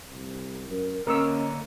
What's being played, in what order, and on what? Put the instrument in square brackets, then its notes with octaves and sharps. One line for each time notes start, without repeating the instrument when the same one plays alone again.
[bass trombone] C2
[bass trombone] F#2 [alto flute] A#4
[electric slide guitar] D3 A#3 C#5 [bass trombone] C#4 [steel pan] A#4 D#6 E6 [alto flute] D#5